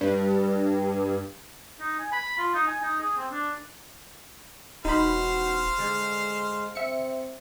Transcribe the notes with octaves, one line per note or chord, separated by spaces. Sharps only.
G2
D#4
G#5
B5
F4
D#4
G#5
D#4
G#4
C4
D4
E1 D#4 F#4 C5 F5 B5
D3 G#3
C4 E5 C#7